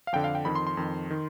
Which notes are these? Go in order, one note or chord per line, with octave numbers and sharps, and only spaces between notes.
F5
F2 D3 G5
F5
G5
F2 D#3 B5
C6
C6
F2 D#3
D#3